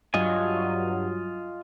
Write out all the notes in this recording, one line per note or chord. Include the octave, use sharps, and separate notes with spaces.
G2 F#3 F4 D#5 G#5